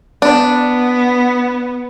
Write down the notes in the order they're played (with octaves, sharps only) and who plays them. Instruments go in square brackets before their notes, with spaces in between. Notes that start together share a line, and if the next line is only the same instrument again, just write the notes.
[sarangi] B3 [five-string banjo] D4